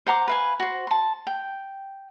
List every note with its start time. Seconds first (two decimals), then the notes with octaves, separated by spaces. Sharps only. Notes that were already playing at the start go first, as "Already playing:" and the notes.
0.07 C5 F#5 A#5 D6
0.28 B4 F5 G#5
0.60 F#4 C5
0.87 A5 C6
1.27 G5